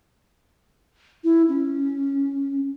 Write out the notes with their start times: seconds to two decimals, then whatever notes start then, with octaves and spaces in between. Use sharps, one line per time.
1.24 E4
1.49 C#4